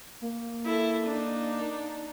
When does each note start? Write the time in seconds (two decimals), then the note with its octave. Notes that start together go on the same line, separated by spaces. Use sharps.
0.22 A#3
0.65 E4 A4
1.07 D4 D#4